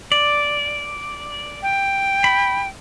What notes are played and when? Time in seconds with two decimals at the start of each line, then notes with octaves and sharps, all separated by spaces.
0.12 D5
1.63 G5
2.24 B5